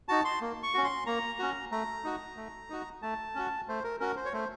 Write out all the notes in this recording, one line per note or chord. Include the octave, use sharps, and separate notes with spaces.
D#4 F#4 A5
C6
A#3
C#6
C#4 F#4
C6
A#3 A#5
C#4 F#4
A3 A#5
D#4 F#4
A3
D#4 F#4
A3 A5
C#4 F#4
A3 C5
A#4
C#4 F#4 A#4
C5
C#5
A3 C5